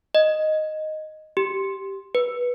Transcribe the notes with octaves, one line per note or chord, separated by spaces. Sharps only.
D#5
G4
B4